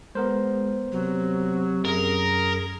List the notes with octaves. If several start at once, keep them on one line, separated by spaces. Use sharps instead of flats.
G#3 B3 A#4 C5
C3 F#3
F#2 G#4 A#4